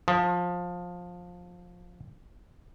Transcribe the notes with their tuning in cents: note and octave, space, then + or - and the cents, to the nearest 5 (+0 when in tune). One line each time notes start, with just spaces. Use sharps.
F3 +15